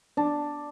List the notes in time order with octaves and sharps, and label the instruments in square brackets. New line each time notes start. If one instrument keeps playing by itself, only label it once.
[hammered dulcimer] D4